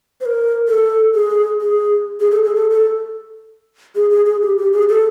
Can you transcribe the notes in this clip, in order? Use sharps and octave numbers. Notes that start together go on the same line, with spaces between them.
C5
A#4
A4
G#4
G#4
G#4
A4
G#4
A4
A4
G#4
G#4
G#4
G4
G4
G#4
A4